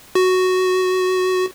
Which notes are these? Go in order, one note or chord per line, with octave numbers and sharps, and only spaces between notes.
F#4